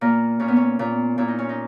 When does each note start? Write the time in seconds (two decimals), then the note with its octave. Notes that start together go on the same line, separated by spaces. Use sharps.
0.01 A#2 A#3
0.40 A#2 C#4
0.48 B3
0.57 C#4
0.79 A#2
1.18 A#2 E4
1.28 D#4
1.38 C#4
1.49 D#4